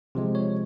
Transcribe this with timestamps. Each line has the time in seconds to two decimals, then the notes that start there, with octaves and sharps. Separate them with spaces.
0.15 C3 F3 G#3
0.35 C#5